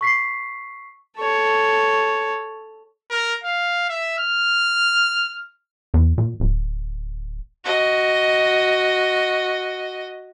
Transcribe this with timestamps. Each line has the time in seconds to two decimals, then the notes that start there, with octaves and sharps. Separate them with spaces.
0.01 C#6 B6 C7
1.18 A4 C#5
3.11 A#4
3.43 F5
3.89 E5
4.18 F6
5.94 E2
6.18 A#2
6.40 D1
7.65 F#4 D#5